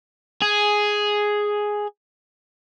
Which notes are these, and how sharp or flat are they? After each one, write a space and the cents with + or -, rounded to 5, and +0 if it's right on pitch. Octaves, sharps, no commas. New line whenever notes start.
G#4 +0